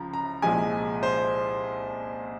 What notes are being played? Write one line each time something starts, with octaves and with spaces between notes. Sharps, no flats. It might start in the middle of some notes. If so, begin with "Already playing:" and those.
Already playing: C#2 C#3 F3 A#5
A#5
C2 A#2 F3 G#3 G#5
C5